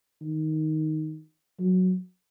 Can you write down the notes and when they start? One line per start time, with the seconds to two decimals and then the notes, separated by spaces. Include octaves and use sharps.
0.21 D#3
1.59 F#3